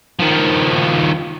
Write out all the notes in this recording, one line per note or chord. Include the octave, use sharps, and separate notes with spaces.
D#3 F3